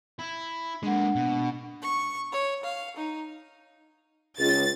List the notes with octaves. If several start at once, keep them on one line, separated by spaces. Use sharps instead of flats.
E4
G#3 A#3 D4 F#5
B2
C#6
C#5
F5
D#4
C#2 A6